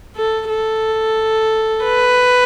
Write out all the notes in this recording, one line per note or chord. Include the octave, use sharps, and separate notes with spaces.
A4
A4
B4